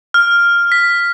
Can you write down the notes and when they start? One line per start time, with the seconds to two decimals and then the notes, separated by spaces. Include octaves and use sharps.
0.14 F6
0.72 B6